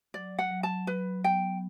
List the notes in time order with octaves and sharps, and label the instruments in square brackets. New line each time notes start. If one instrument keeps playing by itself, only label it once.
[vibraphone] F#3 [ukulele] D5
[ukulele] F#5
[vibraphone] F#3
[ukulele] A5
[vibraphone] F#3 [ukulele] B4
[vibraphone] B3 [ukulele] G5